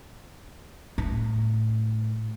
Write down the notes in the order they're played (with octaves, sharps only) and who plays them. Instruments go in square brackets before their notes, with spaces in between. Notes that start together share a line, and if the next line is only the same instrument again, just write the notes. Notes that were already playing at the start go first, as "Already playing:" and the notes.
[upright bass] A2